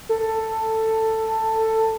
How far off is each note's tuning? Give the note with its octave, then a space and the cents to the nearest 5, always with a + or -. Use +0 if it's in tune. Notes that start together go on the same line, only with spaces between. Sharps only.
A4 +10